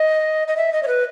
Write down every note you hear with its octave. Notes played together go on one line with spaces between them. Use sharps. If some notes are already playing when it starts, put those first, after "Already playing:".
Already playing: D#5
D#5
E5
D#5
C#5
B4